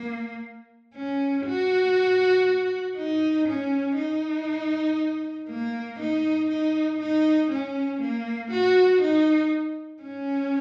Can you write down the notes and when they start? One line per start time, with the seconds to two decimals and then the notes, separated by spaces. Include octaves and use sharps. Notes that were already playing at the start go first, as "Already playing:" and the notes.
Already playing: A#3
0.95 C#4
1.46 F#4
2.97 D#4
3.48 C#4
3.98 D#4
5.50 A#3
6.00 D#4
6.50 D#4
7.01 D#4
7.51 C#4
8.02 A#3
8.52 F#4
9.02 D#4
10.03 C#4